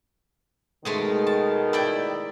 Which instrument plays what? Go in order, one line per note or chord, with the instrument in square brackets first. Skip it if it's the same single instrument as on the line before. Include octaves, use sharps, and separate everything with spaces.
[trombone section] B2 D#3 [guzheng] G#3 A3 G#4
[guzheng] A5
E4 D5 G5